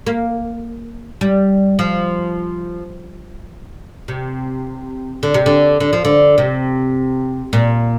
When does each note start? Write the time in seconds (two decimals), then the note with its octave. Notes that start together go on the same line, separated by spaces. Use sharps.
0.07 A#3
1.21 G3
1.79 F3
4.08 C3
5.23 D3
5.34 C3
5.46 D3
5.80 D3
5.93 F3
6.05 D3
6.38 C3
7.53 A#2